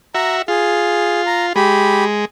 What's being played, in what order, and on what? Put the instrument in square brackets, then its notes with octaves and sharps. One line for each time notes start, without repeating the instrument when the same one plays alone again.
[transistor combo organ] F#4 E5 [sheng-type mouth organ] A#5
[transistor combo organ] F4 [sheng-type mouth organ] G#4
[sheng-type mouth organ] A#5
[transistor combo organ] G#3 [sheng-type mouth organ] G4 B5